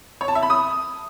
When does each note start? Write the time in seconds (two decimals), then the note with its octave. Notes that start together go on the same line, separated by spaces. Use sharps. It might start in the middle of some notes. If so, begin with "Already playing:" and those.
0.21 C#5
0.28 A5
0.35 E5
0.43 B5
0.50 D#6